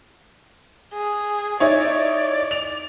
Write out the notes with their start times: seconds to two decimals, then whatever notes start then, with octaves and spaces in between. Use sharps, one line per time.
0.94 G#4
1.60 D#4 E4 C#5 D5
2.51 F7